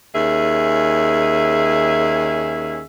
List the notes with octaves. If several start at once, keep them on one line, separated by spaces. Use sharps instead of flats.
D#2 C#4 G#4 E5